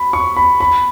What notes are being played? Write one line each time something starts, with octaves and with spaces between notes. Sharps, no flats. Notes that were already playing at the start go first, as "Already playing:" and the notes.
Already playing: B5
C#6
B5
B5